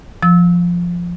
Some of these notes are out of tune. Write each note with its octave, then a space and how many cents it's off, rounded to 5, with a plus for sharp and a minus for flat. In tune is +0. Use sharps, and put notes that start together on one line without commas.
F3 +0 E6 -25